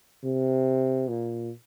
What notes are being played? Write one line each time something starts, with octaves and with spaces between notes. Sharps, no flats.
C3
A#2